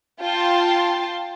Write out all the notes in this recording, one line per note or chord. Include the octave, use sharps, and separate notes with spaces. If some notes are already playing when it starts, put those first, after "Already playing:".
F4 G5 A5 C6